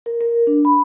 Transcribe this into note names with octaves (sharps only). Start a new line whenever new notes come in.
A#4
A#4
D4
B5